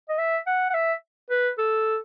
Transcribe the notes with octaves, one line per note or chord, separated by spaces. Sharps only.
D#5
E5
F#5
F#5
E5
B4
A4